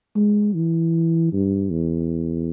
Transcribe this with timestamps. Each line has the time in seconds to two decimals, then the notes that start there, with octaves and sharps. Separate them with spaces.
0.16 G#3
0.55 E3
1.32 G2
1.70 E2